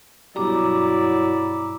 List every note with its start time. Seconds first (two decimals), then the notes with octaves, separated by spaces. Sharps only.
0.36 G2 B2 F#3 G3 E4 D5 A#5 D6